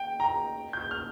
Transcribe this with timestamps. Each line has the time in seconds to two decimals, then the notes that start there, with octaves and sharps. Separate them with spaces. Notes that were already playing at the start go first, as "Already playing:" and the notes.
Already playing: G5
0.20 A#5
0.73 G6
0.91 F6